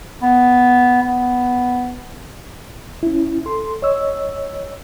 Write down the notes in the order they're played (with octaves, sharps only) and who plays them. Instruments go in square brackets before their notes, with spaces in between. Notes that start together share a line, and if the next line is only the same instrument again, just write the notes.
[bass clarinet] B3
B3
[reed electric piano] C#4 E4
A4 C6
C#5 D#5 E6